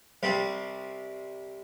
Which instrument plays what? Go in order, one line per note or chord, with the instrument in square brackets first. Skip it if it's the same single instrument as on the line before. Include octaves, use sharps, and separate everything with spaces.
[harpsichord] C2 C3 G3 C4